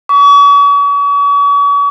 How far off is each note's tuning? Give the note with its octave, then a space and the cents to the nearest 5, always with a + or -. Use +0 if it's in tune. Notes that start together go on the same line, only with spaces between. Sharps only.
C#6 +40